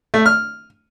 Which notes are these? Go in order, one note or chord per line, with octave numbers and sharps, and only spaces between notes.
A3
F6